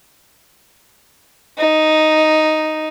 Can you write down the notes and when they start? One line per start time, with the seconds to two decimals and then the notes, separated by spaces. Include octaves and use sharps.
1.58 D#4